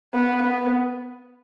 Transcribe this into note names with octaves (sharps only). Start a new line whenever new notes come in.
B3
B3